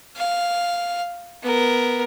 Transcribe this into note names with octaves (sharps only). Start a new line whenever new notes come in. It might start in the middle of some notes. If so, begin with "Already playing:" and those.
F5
B3 A#4